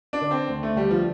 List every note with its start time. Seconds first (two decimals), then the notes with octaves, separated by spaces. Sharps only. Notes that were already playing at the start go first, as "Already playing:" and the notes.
0.13 D4
0.21 D3
0.31 C4
0.49 D2
0.63 A3
0.76 D3 G3
0.90 F3